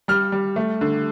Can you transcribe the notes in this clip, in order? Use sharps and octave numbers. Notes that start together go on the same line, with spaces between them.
G3 F6
G3
A3
D3